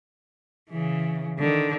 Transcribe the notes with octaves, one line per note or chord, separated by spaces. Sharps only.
C#3 E3
D3 D#3